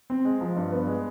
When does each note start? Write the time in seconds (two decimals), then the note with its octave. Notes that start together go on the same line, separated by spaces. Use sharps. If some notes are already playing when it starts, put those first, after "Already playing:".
0.10 C4
0.25 G#3
0.41 F3
0.56 G2
0.72 B3
0.87 G#3